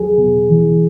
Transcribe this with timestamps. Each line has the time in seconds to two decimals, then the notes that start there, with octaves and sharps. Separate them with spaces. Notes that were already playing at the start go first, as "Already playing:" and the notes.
Already playing: E2 F#3 G#4
0.18 B2
0.50 E3